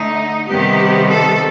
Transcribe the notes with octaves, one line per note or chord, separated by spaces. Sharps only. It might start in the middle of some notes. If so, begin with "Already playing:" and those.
Already playing: D3 A3 D#4
C3 D#3 G3 B3 G4
A4